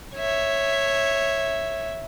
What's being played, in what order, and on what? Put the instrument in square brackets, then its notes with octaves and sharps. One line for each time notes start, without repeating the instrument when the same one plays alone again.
[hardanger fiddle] C#5 E5